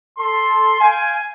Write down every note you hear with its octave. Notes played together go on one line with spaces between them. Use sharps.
A4 C6
F5 G5 G#5